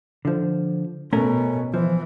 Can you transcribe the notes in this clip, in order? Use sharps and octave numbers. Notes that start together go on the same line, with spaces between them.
D3 F3
B2 A3 C#4 A#4
E3 F3